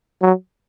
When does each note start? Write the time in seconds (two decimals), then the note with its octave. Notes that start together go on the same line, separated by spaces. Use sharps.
0.22 F#3